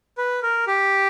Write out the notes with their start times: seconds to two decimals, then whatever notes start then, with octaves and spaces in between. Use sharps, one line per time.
0.18 B4
0.43 A#4
0.67 G4